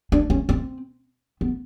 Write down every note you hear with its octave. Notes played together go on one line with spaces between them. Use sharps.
D4
C#4
C4
B3